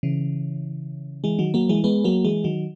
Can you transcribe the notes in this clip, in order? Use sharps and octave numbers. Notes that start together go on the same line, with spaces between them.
C#3 E3
E3 G#3
D#3 F#3
F#3 A#3
E3 G#3
G#3 B3
F#3 A#3
E3 G#3
D#3 F#3